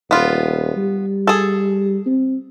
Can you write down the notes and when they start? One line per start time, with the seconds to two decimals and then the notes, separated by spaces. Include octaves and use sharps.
0.11 D#1 B3 F4
0.76 G3
1.27 G#4 A4
2.06 C4